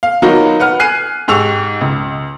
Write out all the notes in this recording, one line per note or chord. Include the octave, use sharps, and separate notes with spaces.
F5
F#3 A#3 B3 D#4 F4 F#4
B4 F#5 F6
G#5 F#6 C7 D#7
G#2 G4 G#4 C#6 E6 F7
C#2